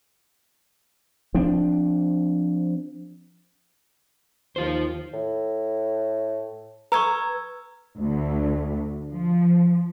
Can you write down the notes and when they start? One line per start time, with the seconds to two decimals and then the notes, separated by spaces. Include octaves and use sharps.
1.35 F3 C4 D4
4.56 D#2 F4 C5
5.14 A2
6.92 B4 A#5 C#6 E6 G#6
7.97 D2
9.12 F3